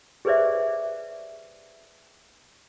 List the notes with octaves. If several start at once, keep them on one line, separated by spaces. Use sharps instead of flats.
G4 G#4 B4 C5 D5 E5